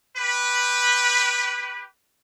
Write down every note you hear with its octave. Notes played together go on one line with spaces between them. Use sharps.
G4 B4